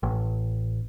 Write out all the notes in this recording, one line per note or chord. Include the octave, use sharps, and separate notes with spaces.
A1